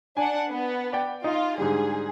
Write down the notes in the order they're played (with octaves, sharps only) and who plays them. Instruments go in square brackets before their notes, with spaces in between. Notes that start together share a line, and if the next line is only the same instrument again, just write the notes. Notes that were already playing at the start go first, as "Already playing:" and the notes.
[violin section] D4 F#5 [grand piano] G#5
[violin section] B3
[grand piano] D5 G5
[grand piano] D#4 [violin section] F4
[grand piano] G#2 D3 G3 [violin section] G#4